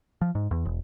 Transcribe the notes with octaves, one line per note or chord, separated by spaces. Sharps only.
F3
G#2
E2
E1